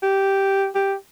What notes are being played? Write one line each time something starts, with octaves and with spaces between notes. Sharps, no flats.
G4
G4